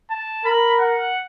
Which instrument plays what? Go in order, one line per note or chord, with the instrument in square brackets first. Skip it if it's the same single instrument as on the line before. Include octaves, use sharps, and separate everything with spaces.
[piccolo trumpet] A5
[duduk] A#4 [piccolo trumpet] B5
[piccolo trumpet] F#5